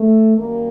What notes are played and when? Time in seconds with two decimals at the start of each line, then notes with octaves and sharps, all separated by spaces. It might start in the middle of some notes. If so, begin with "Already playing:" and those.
Already playing: A3
0.38 F#2 D#3 G3 A#3